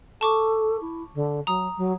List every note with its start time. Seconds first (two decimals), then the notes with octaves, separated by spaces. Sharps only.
0.21 A4 A5 C#6 D6
0.81 E4
1.14 D3
1.47 F#3 A#5 D#6
1.77 F#3